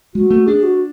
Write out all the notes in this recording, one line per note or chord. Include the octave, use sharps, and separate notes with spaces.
G#3 F#4
A3
D4 G#4
F#4